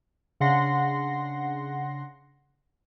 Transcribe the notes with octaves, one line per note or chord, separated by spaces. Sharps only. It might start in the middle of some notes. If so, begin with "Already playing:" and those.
C#3 D4 F#5 C6 A#6 C7